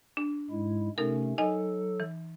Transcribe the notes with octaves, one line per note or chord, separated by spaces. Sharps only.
D4
G#2 G#3 E4
C3 A3 C#4 D#4 A4 A#4
F#3 D#4 A4 D#5 G#5
E3